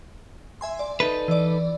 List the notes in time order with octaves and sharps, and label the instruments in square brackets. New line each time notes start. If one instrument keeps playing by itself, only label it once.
[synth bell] E5 G#5 C6
D5
[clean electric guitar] D#4 A4 B4
[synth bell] E3 D5